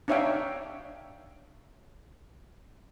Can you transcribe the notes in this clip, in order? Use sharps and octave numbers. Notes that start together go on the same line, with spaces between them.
D4 D#4 C#5 E5 F5 G5